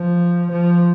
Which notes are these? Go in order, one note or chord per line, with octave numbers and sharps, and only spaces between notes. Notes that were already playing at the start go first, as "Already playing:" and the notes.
Already playing: F3
F3